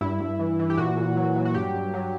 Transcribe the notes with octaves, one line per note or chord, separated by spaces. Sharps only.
G2 E4
G2
E3
E3
G4
A#2 F#4
A#2
F#3
F#3
F#4
G2 G4
G2
F#3